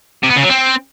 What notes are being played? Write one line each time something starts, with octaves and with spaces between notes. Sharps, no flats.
C3
B3
C#3
F#3
C4